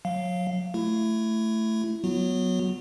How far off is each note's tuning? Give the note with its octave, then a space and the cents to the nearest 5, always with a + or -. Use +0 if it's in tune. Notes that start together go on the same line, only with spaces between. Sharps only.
F#3 -30 F5 -5
A3 +0 E4 +20
F#3 +0 B3 +0 F#4 -30